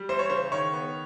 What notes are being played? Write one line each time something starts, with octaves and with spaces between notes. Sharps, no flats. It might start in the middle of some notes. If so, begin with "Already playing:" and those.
Already playing: G3
E3 C5
C#5
C#3 C5
D#3 C#5
B3